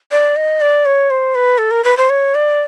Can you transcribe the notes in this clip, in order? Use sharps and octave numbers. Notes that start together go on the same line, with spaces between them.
D5
D#5
D5
C#5
C5
B4
A4
A#4
B4
C5
C#5
D5